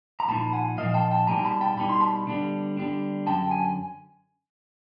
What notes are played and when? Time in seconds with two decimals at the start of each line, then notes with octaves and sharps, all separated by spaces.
0.20 A#5
0.28 A#2 F3 A#3 D#4 A5 B5
0.53 F#5 G#5
0.78 A#2 F3 A#3 D#4 D#5 F5
0.94 G5 A5
1.11 G5 A5
1.27 B2 G3 A#3 D#4 G#5 A#5
1.45 A5 B5
1.61 G5 A5
1.77 B2 G3 A#3 D#4 B5
1.89 C6
2.00 A5 B5
2.27 D3 G3 B3 D4
2.77 D3 G3 B3 D4
3.27 F#2 D3 F#3 G5 A5
3.51 G#5